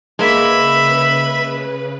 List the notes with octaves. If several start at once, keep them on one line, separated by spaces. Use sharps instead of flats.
C#3 G#3 A#3 B4 E5 B5